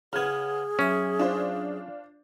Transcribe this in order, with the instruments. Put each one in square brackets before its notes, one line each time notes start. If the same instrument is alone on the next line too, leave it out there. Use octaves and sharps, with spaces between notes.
[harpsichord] C#3 B3 [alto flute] G#4 [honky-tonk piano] F6 G#6
[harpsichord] B1 E5 [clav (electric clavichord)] C#4
[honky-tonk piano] D4 F4 C5